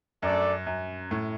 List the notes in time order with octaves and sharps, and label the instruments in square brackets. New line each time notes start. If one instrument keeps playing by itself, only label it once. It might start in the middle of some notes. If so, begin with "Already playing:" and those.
[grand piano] F#2 [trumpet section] A3 D4 A4 D5
[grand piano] F#2
A2